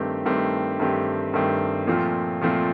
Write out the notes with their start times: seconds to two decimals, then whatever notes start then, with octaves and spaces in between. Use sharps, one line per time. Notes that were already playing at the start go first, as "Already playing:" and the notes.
Already playing: G2 D#3 A3 C4 G4
0.25 G2 D#3 A3 C4 G4
0.79 G2 D#3 A3 C4 G4
1.33 G2 D#3 A3 C4 G4
1.87 A#2 F3 A3 C4 F4
2.41 A#2 F3 A3 C4 F4